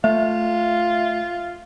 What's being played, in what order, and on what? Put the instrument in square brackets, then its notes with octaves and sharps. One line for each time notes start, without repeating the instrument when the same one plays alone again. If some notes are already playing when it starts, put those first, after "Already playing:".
[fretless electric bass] A3 [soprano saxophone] F4 [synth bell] E5